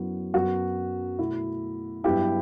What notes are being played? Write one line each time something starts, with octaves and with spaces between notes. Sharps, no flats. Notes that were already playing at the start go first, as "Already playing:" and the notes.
Already playing: F#2 F#3 B3 E4 F#4
F#2 F#3 B3 F#4
B2 A3 E4
G2 F#3 B3 E4 G4